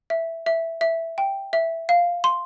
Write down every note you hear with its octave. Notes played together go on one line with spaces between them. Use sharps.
E5
E5
E5
G5
E5
F5
C6